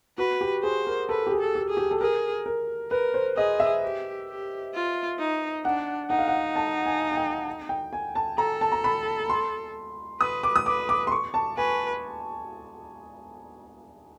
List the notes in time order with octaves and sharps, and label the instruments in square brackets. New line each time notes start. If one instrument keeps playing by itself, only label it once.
[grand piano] F#4 [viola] B4
[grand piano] G4
[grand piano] G#4 [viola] C5
[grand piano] A#4
[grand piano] A4 [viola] B4
[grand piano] G4
G#4
[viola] A4
[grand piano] G4
[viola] G#4
[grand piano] G4
A4
[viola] G#4 [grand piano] A#4
[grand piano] A#4
[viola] A#4 [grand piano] B4
[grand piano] C5
[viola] G#4 [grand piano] D#5
[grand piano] E5
[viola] G4
G4
F4
D#4
[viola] D4 [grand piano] F#5
[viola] D#4 [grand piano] F#5
[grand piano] F5
F#5
A5
G#5
G#5
G5
G5
G#5
A5
[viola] A4 [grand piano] A#5
[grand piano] A5
A#5
B5
C6
[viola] B4 [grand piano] D#6
[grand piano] D6
D#6
[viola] B4 [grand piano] D6
[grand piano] D6
C6
C#6
A5
[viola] B4 [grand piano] G#5